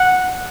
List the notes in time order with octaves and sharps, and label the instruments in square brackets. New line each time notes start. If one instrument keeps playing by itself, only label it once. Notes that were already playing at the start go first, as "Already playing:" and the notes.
Already playing: [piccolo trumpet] F#5